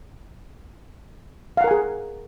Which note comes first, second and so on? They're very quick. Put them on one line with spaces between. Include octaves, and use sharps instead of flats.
F5 F#5 A#4 G#5 G#4